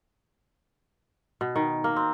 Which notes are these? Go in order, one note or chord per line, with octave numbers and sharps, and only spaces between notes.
B2
D#3
A#3
C4